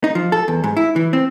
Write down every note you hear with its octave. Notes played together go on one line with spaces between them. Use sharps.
D#4
F3
A4
E2
G#2
E4
E3
C4